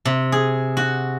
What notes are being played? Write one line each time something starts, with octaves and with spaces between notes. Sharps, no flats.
C3
G#4
F#4